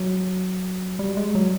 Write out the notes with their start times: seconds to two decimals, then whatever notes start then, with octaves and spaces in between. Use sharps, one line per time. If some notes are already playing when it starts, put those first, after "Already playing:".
Already playing: F#3
0.99 G3
1.17 G#3
1.35 F#3